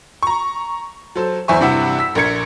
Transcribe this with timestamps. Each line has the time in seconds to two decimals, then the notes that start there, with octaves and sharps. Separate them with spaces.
0.23 A#5 C#6
1.16 F#3 A4 C5
1.48 E2 E4 C5 E5 G#5 C#6
1.60 G2 C3 E4 F#5 E6
1.99 E6 B6
2.15 A#1 A#4 G#6 C#7